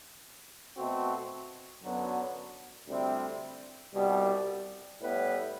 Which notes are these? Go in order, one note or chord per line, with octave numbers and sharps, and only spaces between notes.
B2 A3 C4 F#4
F#2 D3 F#3 B3
D2 C3 G3 C4 E4
C2 B2 G3
A2 G3 B3 E4 B4